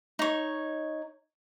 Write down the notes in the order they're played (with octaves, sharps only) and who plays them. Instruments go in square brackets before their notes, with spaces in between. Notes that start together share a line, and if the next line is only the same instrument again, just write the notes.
[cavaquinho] D#4 C#5